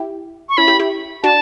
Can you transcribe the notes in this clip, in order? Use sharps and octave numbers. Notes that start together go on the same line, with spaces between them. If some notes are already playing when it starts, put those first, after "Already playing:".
Already playing: E4 G4
C#6
C#4 E4 B5
E4 G4
E4 G4
D4 F#4 A5